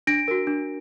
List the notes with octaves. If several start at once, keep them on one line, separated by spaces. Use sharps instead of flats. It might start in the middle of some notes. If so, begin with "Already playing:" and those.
D4 A#6 D7
F#4 A#4
D4